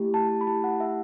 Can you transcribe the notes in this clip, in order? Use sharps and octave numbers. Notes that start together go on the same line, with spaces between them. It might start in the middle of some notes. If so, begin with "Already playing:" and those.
Already playing: A3 E4 G4
A5
B5
A3 E4 G4 A5
F#5
E5